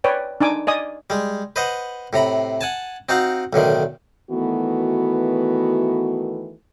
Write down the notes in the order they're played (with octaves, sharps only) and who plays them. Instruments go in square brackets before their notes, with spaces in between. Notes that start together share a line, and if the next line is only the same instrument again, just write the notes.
[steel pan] B4 C#5 D5 G5
D4 D#4 G#5 D6
D5 D#5 G#5 D#6
[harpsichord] G3 G#3
B4 C5 D#5 F#5
A2 C3 A#5 B5
F#5 G#5 A5
C4 D#4 F#4 F5 F#5
B1 A2 D3 D#3
[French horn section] D#3 E3 A3 B3 F#4